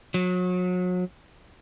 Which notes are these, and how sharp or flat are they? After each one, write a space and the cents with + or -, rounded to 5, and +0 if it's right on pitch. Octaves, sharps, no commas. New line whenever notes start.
F#3 -35